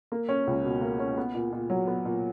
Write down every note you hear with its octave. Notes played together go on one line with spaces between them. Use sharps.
A#3
C#4
C#2
B2
A#3
C#4
B3
A#2
A#2
F#3
B3
A#2